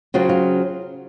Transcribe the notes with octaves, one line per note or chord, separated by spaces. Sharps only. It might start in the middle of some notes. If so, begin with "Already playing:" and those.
C#3 F#3 C4 F4
F4